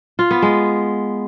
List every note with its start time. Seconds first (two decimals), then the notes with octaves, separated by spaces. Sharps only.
0.19 F4
0.31 B3
0.42 G#3